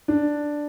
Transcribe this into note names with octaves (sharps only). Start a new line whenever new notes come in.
D4